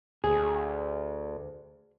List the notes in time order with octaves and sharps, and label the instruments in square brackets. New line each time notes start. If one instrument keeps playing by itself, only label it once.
[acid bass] D2 [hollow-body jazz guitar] G#4